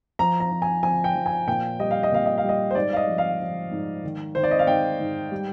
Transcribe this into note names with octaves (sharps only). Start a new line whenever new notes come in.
F3 A#5
A#5
F3
G#5
F3 G#5
G5
F3
G#5
A#2 G5
G3 D#5
F5
D#5
A#2 F5
D#5
F5
G3 D#5
C5
G#2 D5
F5
D#5
F3
F5
F3
G#2
D#3
D#3 C5
D5
D#5
F5
G#2 G5
G#2
G3